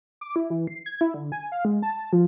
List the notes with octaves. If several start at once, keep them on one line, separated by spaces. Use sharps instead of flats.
D6
E4
E3
C7
G#6
E4
D3
G#5
F5
G#3
A5
F3